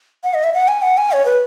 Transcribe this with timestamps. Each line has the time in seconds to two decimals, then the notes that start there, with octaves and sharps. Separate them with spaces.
0.24 F#5
0.34 D#5
0.44 E5
0.54 F#5
0.68 G#5
0.82 F#5
0.98 G#5
1.12 C#5
1.25 B4